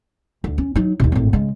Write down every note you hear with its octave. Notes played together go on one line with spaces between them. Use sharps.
D2
C#4
F#3 D#4
D#2 C3
G#1 A2
C#3 G#3